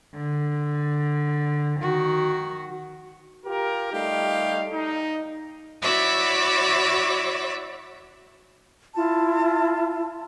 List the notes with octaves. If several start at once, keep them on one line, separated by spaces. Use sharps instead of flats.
D3
D#3 F#4
F4 G4 A#4
G3 A3 D#4 G4 F5
D#4
E4 F#4 C#5 D5 E5 D6
E4 F4 A5